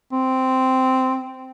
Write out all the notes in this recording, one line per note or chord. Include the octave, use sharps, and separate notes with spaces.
C4